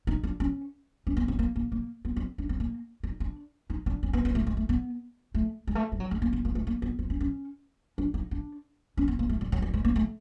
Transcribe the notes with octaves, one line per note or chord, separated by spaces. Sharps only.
D#4
D4
C#4
C#4
B3
C4
A#3
A#3
A#3
B3
C4
D4
C4
A#3
D#4
D4
D#4
D4
C#4
B3
B3
A3
G#3
A3
B3
A3
G#3
A3
G3
F#3
G#3
A#3
B3
A#3
A3
A#3
B3
C4
C#4
C#4
D4
D#4
D4
C#4
B3
A#3
A3
G3
F#3
G3
G#3
A#3
A3